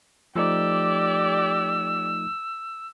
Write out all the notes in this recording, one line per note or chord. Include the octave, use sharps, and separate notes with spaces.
F3 A3 D#4 G4 D5 E6